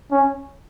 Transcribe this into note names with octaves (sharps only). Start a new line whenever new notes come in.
C#4